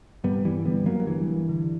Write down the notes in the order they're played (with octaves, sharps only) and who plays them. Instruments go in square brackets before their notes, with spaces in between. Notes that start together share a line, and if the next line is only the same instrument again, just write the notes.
[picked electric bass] G2 G3 B3
E3 G3
D3 G3 B3
F#3 A#3
F#3
G2 E3
D3